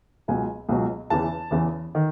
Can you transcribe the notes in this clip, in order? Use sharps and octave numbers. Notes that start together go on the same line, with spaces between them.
C#2 B2 F#3 G#5
C#2 B2 F#3
E2 C#3 E3 A5
E2 C#3 E3
D#3